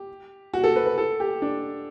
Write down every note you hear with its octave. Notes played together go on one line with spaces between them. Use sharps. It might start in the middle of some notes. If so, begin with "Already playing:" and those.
Already playing: G4
F#4
A4
B4
B4
A4
G4
D4